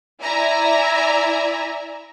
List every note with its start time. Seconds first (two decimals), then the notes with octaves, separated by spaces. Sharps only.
0.22 E4 D5 E5 G#5 A#5